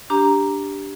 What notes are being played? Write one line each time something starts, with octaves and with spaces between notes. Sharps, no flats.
D4 G4 A#5